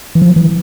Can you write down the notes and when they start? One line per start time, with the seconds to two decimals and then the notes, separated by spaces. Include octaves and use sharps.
0.15 E3
0.22 F3
0.36 E3